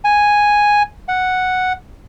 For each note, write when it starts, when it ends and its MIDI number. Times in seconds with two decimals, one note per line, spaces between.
0.05 0.83 80
1.09 1.73 78